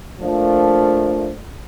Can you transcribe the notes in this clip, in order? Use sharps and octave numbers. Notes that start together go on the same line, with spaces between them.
F3 A3 A#3 D4